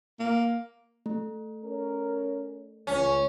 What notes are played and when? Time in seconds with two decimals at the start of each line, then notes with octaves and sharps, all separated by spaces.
0.19 A#3
1.06 A3
1.64 C#4 A#4
2.87 C#2 C#4